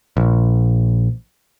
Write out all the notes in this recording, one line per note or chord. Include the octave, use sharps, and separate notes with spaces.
A#1